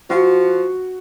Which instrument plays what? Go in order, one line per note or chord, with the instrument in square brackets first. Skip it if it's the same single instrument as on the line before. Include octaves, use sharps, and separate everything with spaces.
[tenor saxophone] F3 [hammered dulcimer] F#4